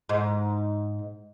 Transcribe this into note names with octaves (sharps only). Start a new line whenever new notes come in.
G#2